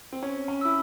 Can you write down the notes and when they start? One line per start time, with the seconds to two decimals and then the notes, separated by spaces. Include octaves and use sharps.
0.12 C4
0.23 C#4 C#5
0.48 C#4
0.61 E4 E6